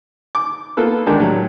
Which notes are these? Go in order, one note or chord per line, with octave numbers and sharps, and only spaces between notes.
D6
A#3 B3 F4 A4 B4
D3 D#3 G#3 D4
A2 F#3 G4